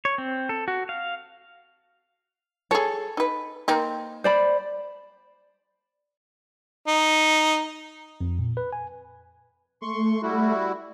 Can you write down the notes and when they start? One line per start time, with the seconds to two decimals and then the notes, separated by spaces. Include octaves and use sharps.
0.05 C#5
0.18 C4
0.49 A4
0.68 F#4
0.89 F5
2.71 G#4 A4 C#5
3.17 D#4 B4
3.68 A#3 C4 D#4
4.24 C5 D5 B5
6.88 D#4
8.21 F2
8.39 A#2
8.57 B4
8.73 G#5
9.82 A3 C6 C#6
10.22 G3 E4 F#4